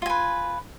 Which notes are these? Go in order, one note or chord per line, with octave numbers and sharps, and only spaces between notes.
F4 B4 G#5